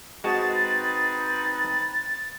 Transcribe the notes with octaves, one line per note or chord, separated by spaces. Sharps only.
G#3 C4 D#4 F#4 B4 A5 A6